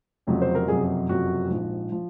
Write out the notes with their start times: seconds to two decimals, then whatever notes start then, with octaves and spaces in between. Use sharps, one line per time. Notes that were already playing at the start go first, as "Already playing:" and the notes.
0.27 F1 F2 C#3 F#3
0.42 C5
0.55 A#4
0.68 F#1 F2 C3 F#3 G#4
1.09 F#1 F2 C3 F#3 F#4
1.50 A#1 G#2 F3
1.92 F3